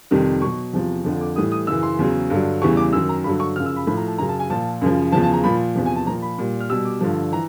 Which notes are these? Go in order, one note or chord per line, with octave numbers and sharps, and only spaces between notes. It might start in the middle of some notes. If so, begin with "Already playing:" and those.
F2 C3 D#3 G3
B2 F#3 C#6
E2 C3 F3
F2 D3 F3
D6
A2 E3 G3 D#6
D#6
F#2 C#3 E3 E6
C6
E2 C#3 F#3
G2 D3 F#3
E2 C#3 E3 G3 C#6
D6
F#2 D#3 F#3 E6
A#5
G2 D3 F#3 B5
C#6
F#2 C#3 F3 F6
E6
B5
A2 F3 B5
A#5
A5
F#2 C#3 F#3 A#5
A5
G#5
A#2 F3 A5
F#2 C#3 F3
E2 C#3 F3 A5
A5
A#5
A#2 F3 B5
E2 C3 F3
G#5
A5
A#2 F3 A#5
B5
A#2 G3
F6
B2 G3 E6
D6
G2 D3 F3
E3 A#5